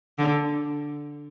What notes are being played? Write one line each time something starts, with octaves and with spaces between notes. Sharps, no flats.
D3